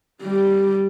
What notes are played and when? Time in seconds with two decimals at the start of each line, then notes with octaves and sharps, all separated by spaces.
0.23 G3 G4